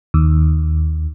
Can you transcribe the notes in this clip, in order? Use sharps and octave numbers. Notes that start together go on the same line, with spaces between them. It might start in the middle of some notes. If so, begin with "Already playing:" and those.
D#2